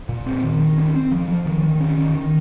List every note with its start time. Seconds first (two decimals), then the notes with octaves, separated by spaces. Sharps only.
0.09 A#2
0.26 C4
0.44 D#3
0.60 D#3
0.78 C#4
0.95 C4
1.12 F3
1.28 F3
1.46 D#3
1.63 D#3
1.80 C#4
1.98 D#3
2.15 D#3